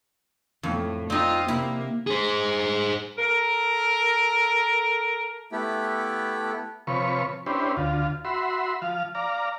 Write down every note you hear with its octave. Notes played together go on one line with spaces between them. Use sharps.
F2 A2
C4 D#4 F4 D#5
C3 A#3 E4
G#4 C5
A4 A#4
A3 B3 E4 G4
C3 F3 B4 C#5 C#6
C#4 D4 E4 G4 B4 C5
D2 F4
F#4 E5 B5 C6
F3 F5
D5 F5 A#5